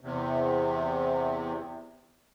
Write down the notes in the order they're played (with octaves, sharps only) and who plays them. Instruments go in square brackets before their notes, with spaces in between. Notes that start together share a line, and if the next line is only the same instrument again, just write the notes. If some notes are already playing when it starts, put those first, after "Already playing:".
[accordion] E2 C3